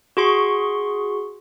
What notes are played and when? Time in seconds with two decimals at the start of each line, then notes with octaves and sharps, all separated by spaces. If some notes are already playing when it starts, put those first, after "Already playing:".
0.17 F#4 G#4 C6 C#6